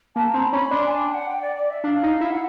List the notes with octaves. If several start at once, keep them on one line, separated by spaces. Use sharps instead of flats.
A#3 A5
C4 A#5
B5
C#4
B5
D4 C6
G#5
G5
F#5
G5
D5
D5
E5
D4 F5
D#4
E4
F#5